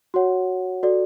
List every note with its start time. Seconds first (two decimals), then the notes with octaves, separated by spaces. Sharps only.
0.14 F#4 C#5 F#5
0.83 F#4 A4 D5